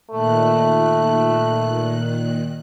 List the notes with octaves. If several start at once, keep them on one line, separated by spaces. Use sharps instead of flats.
A#2 D#3 A3 F#6